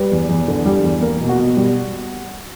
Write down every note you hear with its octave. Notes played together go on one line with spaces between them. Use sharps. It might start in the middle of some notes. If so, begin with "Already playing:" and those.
Already playing: G3 B4
E2
E2
D3
G3
E2
A#3 A#4
B2
F#4
B2
G3